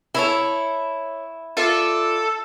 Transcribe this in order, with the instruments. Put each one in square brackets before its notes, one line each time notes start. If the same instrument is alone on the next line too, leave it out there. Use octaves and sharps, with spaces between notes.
[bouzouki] E4 [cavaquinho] A4 C#5 E5
[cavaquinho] F4 D5 E5 [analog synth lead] A4